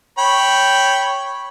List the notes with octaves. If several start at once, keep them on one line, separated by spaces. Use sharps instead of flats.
C#5 G5 B5